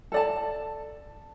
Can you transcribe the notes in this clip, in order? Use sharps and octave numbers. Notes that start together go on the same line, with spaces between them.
A4 D5 A5